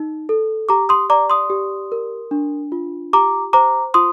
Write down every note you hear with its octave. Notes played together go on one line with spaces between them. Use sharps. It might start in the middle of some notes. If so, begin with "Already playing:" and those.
Already playing: D#4
A4
G4 A#5 D6
C6 D#6
D5 A#5 D6
C6 D#6
G4
A#4
D4
F4
G4 A#5 D6
C5 A#5 D6
F4 C6 D#6